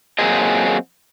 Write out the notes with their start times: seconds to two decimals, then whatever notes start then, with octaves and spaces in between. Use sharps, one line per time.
0.18 F#3 A#3 C4 F4 G#4 D#5